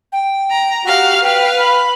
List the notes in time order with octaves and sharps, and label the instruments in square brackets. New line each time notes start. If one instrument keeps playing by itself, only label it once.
[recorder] G5
[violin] A#5
[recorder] F#4 [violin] G4 F5
[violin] B4 F5 [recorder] G5
[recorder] B5